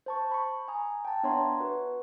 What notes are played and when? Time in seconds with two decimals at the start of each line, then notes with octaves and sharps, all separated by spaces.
0.06 C5 A5 C#6
0.31 B5 C#6
0.68 G#5 A#5 D#6
1.05 G5 A5
1.23 B3 D4 C#5 E5 A#5 C6
1.60 F#4 B4